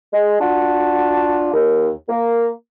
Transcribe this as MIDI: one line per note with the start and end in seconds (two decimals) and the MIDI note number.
0.12 0.36 56
0.41 1.48 62
0.41 1.48 65
0.41 1.48 66
0.41 1.48 78
0.41 1.48 81
1.53 1.90 39
2.09 2.49 58